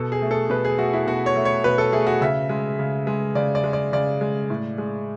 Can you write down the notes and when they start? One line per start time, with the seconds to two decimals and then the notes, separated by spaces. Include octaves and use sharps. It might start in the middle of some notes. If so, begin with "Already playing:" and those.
Already playing: B2 A4
0.12 G#4
0.22 A3
0.31 A4
0.49 B2 B4
0.65 G#4
0.78 A3 F#4
0.93 E4
1.07 B2 F#4
1.26 C#5
1.36 A3
1.45 C#5
1.64 B2 B4
1.78 A4
1.93 A3 G#4
2.07 F#4
2.21 C#3 E5
2.49 G#3
2.79 C#3
3.07 G#3
3.35 C#3 D5
3.55 D5
3.64 G#3
3.73 D5
3.93 C#3 D5
4.21 G#3
4.50 A2
4.78 G#3